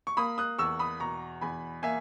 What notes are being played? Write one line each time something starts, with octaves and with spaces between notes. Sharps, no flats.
C#6
A#3 B5 D#6
D#6 F#6
E2 C#6 E6
B5 D#6
B2 A#5 C#6
E2 G#5 B5
A#3 E5 G#5